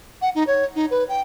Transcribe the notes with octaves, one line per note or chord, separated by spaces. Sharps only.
F#5
D#4
C#5
D#4
B4
G5